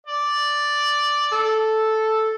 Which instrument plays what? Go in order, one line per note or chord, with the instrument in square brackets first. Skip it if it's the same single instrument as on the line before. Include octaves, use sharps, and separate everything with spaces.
[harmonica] D5
[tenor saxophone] A4